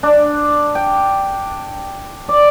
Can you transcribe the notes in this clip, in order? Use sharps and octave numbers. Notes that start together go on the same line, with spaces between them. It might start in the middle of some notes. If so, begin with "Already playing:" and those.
D4
G5
D5